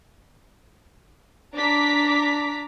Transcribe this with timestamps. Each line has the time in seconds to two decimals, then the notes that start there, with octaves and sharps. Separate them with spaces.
1.56 D4 A#5 D6 B6